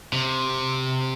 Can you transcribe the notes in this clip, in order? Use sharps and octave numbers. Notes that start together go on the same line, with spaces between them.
C3